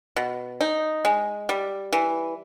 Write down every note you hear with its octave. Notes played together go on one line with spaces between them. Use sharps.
B2
D#4
G#3
G3
E3